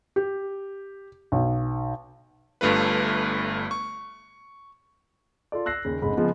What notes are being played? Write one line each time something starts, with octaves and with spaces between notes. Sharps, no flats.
G4
B1
G1 G2 A3 F4 B4
C#6
F4 A4 D5
E6 F#6 A#6 C7
D#2 C#3
F1 G#2 C#3 B5
C#3 F3 G#3 B3